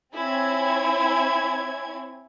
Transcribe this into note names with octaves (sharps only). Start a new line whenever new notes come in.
C4 E4 C#5 G#5 G#6